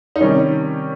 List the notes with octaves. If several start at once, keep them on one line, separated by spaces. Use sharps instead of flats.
D#4
C3 D#3 G3 C#4